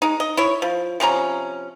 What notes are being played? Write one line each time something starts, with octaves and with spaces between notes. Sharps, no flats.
G#3 D#4
D#5
E4 C#5
F3
C3 F3 C#4 A#5